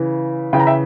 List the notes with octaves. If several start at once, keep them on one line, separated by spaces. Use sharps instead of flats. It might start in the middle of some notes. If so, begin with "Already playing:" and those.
Already playing: C#3 E3
C#3 E3 G5
A#5
E5 G5